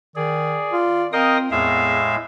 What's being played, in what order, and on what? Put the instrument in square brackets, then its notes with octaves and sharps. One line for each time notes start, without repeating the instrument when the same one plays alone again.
[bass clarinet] D#3 [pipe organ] G#4 [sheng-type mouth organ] D5
[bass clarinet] F4
[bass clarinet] C4 [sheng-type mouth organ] A#4 D#5 [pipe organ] F5 G5 D#6
[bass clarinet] E2 [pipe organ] A2 G#3 [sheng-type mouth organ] E5 F5